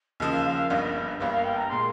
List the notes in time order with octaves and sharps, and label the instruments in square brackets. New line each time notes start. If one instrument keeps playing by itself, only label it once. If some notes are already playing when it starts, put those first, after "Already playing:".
[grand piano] D#2 C#3 F3 [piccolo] D#5
[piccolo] F5
F5
F5
[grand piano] G1 G2 G3 A#3 [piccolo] D#5
[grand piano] G1 G2 G3 A#3 [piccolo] F5
[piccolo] F5
G5
A#5
[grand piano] A#2 G#3 [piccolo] C6